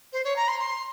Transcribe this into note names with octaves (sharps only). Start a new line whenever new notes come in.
C5
C#5
A#5
C6
C6